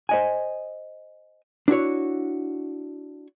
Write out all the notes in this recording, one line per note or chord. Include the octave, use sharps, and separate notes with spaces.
C5 D#5 G#5
D4 E4 F#4 C#5